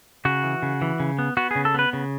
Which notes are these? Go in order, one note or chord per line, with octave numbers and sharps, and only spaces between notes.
C#3 F#4
E3
C#3
E3
C#3
B3
B3 F#4
C#3 G#4
A4
B3 B4
C#3